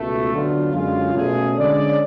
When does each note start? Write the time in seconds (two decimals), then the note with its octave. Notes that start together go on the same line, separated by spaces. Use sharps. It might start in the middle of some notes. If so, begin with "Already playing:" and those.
Already playing: C#2 B2 A3
0.31 D3 F#3 B3 D4 F4
0.73 F#2 D3 G#3 C#4 F4
1.15 B2 A3 C#4 G#4
1.57 D3 G#3 C#4 G#4 D5